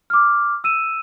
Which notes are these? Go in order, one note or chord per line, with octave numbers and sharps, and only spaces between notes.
D6 F6
E6 D#7 E7